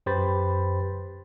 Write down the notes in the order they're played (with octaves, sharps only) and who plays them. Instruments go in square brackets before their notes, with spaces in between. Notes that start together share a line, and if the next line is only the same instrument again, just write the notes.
[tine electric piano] F#2 G4 B4 C5 B5 A6